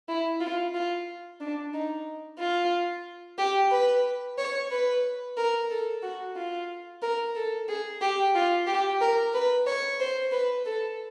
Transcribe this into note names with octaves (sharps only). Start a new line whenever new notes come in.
E4
F4
F4
D4
D#4
F4
G4
B4
C#5
B4
A#4
A4
F#4
F4
A#4
A4
G#4
G4
F4
G4
A#4
B4
C#5
C5
B4
A4